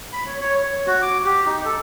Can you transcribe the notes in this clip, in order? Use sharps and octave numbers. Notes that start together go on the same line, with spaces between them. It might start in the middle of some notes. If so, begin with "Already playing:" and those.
B5
C#5
C#5
C#5
F#4
D6
G4
D#4
A4